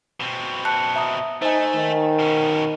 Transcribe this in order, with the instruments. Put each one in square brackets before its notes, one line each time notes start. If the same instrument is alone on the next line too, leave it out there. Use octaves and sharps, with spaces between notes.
[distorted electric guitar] B2 C4
[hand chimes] A5 F#6 C#7
E5 A#5 D#6
[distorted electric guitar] A3 [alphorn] D#4 [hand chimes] C5 G#5
[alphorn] D#3
[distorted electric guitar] B2 C#4